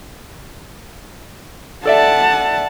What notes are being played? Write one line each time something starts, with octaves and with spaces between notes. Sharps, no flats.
A4 D5 E5 F#5 A5